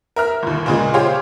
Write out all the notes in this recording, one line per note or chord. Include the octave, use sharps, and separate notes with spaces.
A#4 E5 F6
G1 D#2
A#2 C#3 G#3
F4 G4 G#4 C5 C#5 F5